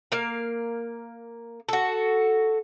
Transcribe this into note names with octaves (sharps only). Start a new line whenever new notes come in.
A#3 F5
F#4 A4